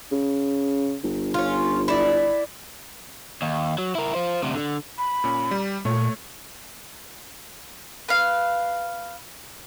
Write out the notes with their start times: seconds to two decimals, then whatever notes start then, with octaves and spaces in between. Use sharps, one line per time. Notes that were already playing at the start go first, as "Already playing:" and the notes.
0.12 C#3
1.04 G1
1.34 C#4 F4
1.88 E4 D5
3.42 D#2
3.78 F#3
3.95 E4 A#4
4.15 F4 C5
4.43 D2 C3
4.54 D3
4.98 B5
5.24 A#2 C#4
5.51 G3
5.85 A#2 A3 C#5 C#6
8.08 B4 F5